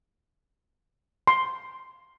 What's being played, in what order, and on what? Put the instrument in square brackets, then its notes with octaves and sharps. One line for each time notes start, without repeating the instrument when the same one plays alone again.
[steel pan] C6